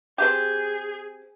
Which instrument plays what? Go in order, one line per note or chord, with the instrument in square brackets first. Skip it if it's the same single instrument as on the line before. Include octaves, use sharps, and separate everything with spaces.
[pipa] C4 G4 [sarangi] G#4